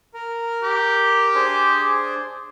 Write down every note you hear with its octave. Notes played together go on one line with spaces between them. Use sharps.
A#4
G4
D4 G#4 C5